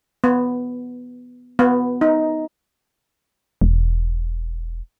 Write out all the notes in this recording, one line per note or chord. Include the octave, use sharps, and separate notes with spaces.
B3
B3
D#4
E1